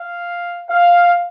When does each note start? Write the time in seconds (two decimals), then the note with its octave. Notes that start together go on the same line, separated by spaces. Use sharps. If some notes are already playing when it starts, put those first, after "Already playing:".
Already playing: F5
0.70 F5